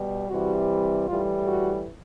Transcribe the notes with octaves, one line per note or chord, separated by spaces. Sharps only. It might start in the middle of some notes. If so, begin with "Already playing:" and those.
Already playing: B2 G3
C3 E3 G3 F#4
A2 E3 G3 F4
F#4